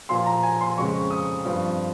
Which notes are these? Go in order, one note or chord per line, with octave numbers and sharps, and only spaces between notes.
A#2 F3 A#3 C6
A#5
G#5
C6
F2 C#3 G#3 C4 C#6
D#6
G2 F3 C4